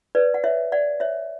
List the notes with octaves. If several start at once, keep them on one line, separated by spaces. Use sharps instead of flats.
B4 D5
F#5
C#5 E5
D5 F#5
C#5 E5